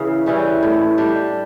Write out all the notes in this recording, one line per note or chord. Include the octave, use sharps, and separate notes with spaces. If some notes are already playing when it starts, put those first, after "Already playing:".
Already playing: C#3 E3 C#4
E3 G3 C#4
A2
G3 D4